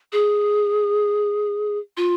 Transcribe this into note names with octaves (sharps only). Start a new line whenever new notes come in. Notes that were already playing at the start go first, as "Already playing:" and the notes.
G#4
F4